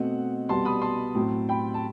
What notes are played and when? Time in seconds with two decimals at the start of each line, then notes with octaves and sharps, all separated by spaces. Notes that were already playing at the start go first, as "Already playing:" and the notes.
Already playing: B2 A3 C4 D#5 F#5
0.49 C2 B2 G3 B3 A5 C6
0.65 B5 D#6
0.82 A5 C6
1.15 A2 F#3 C4
1.49 G5 B5
1.74 A5